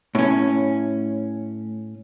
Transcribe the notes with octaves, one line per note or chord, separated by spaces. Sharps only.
A2 C#4